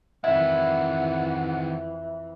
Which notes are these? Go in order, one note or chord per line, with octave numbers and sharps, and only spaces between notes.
F2 D#3 E3 C4 E4 F#5